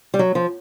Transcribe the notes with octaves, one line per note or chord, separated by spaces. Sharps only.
G3
F#3
F3